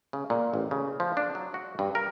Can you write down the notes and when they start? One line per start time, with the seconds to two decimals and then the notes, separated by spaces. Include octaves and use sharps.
0.13 C#3
0.30 A#2
0.54 A1
0.71 C#3
1.00 F3
1.17 D4
1.35 F#3
1.54 F#4
1.79 G2
1.95 A#4